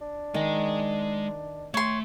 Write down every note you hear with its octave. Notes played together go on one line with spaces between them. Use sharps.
D4
D#3 G#3 G#5
A3 C#5 C6